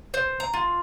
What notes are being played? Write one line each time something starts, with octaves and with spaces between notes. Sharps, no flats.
C5
A#5
F4